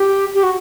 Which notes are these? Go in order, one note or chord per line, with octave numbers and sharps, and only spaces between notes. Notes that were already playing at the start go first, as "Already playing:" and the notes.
Already playing: G4
G4
F#4